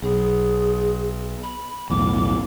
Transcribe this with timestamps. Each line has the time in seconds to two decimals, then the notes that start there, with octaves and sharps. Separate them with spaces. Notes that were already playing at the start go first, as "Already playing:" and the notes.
0.02 B1 G#4
1.43 B5
1.90 B1 E2 A2 D6